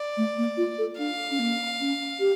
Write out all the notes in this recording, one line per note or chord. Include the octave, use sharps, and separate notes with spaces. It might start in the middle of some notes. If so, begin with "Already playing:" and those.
Already playing: D5
A3
A#3
F4
A4
D4 F5
C#4
A#3
C#4
G4